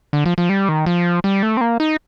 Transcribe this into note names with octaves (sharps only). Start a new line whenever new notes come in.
D3
F3
F3
G3
D#3
F3
G3
A3
C4
A#3
D#4